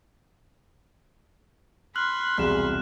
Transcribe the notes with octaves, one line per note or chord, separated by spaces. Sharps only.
B5 C6 F6 F#6 F#7
E1 C2 G#4 F#6 E7